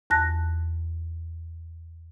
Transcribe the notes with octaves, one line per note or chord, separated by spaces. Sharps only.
E2 A5 F#6 A#6